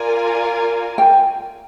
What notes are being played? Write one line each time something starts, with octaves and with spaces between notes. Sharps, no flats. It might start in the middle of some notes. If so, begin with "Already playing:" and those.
Already playing: F4 A#4 D5 F5 G#5
G5